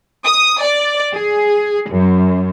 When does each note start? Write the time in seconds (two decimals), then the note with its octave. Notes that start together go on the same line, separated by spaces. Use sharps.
0.24 D#6
0.62 D5
1.14 G#4
1.91 F#2